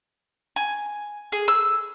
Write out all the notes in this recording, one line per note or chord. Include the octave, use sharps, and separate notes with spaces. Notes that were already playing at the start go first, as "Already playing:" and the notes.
G#5
G#4
E6